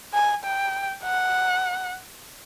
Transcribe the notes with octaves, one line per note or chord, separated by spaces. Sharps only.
G#5
G5
F#5